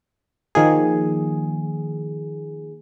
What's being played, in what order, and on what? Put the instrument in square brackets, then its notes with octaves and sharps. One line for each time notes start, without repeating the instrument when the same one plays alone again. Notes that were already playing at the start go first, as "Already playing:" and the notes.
[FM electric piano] D#3 F3 A#3 G#4